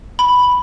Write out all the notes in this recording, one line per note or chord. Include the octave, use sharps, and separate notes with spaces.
B5